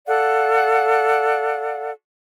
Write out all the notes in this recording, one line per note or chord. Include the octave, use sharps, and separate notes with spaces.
A4 D5 F5 F#5